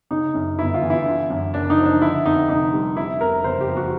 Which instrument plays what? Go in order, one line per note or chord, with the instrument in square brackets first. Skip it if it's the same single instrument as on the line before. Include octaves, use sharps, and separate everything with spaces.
[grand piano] C#3 D#4
F#2
G1 E4
F4
E3
E4
D3
F#2
F#1 D4
D#4
F3
D4
D3 E4
F2 D#4
F1 D#4
G3
C3 E4
F2 A#4
F#1 C5
G4
F3
F#4